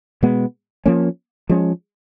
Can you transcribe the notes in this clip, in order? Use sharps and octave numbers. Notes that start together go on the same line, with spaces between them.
B2 G#3 B3
F3 A#3 C#4
F3 G#3 C#4